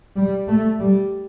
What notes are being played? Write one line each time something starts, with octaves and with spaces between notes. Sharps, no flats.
G3
A3
G3